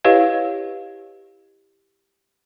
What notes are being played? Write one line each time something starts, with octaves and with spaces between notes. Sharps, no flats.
E4 G4 B4 C#5 D#5 F5